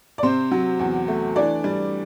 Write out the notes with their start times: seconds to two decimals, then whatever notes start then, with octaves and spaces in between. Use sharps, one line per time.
0.18 D5
0.23 C3 C4 C5
0.51 F#3
0.79 E2
1.08 A3
1.36 E3 D4 D5
1.64 G3